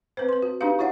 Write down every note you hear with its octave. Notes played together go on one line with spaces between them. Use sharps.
C4 B4 C5
B4 C6
F#4
D4 D#4 G4 B4 F5
E4 F#4 C#5 E5 F#5